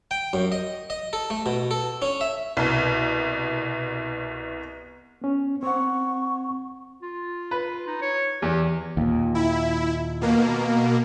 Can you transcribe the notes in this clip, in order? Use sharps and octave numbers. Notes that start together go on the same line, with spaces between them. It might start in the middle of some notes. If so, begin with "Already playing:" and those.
G5
F#2
D#5
D#5
A4
A3
B2
A4
C#4
E5
C2 B2
B3 C#4
C4 F#5 C#6
F4
B4
D#4
C#5
E2 G4
D#2 A#2
E4
B2 A#3